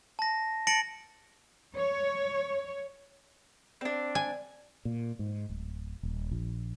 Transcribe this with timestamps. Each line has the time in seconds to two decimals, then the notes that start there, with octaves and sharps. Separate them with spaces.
0.19 A5 A#6
0.67 A5 A6 A#6 C#7 D7 F#7
1.75 C#5
3.81 C4 D4 D5
4.15 G#5
4.85 A#2
5.19 G#2
5.49 D1
6.03 D#1
6.31 A#1